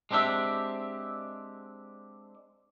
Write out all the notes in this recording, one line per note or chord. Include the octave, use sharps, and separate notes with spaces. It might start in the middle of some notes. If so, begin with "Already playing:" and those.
G#3 C4 D4 G4 E5